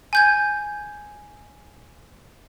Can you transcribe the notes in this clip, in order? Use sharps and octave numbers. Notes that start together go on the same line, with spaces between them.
G#5 G6 G#6